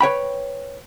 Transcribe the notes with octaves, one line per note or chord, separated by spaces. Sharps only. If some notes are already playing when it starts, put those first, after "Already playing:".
B4 C#5 G5 B5